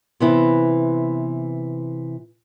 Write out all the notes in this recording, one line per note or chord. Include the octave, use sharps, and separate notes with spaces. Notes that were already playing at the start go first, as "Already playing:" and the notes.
C3 E3 B3 E4